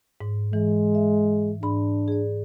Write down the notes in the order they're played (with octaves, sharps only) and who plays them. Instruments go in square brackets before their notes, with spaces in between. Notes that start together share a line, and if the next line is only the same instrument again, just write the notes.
[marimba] G#2
[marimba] E3 [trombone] G#3
[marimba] E5
[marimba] G#2 B5 [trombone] D4
[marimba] G#4 D5